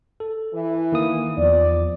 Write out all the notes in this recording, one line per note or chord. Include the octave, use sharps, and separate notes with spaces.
A4
E3
D#3 A#3 D#6
E2 F3 D5